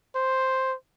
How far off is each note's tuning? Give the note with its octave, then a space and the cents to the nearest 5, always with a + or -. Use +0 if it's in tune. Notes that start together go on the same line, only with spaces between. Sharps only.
C5 +5